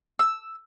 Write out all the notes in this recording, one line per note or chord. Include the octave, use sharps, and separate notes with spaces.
E6